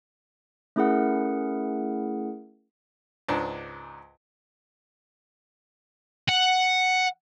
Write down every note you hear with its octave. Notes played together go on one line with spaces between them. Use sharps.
A3 C#4 E4 G#4 A#4 F#5
C#2 G#2 D4
F#5